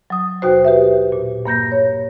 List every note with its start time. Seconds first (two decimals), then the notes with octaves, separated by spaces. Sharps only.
0.10 F#3 D#6
0.42 D#2 B2 F#4 C5
0.65 G4 B4 E5
1.12 A#2
1.45 G2 A#3 G6 A#6
1.72 C#5